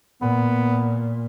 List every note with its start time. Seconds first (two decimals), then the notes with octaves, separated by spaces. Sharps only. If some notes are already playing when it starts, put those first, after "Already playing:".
0.22 A#2 B3